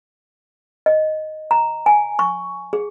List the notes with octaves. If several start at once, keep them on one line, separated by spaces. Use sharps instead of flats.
D#5
A#5
G#5
C#6
G#4